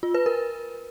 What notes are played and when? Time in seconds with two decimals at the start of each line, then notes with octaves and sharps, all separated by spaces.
0.03 F4
0.14 B4
0.26 A#4